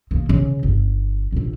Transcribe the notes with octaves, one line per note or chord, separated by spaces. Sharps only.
D#3 A#3
C#3
G1
A#1 D3